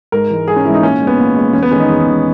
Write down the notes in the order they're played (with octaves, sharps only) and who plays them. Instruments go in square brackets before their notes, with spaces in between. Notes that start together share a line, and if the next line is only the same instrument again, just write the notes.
[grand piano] G#2 A#4
E3 G#3
G#2 G#4
C#4
E3 G#3 E4
D#4
A#2 C#4
G#3
B3
A#2
G#3
E2 C#4
B3
D#3 G#3 C#4
D#4
E2
D#3 G#3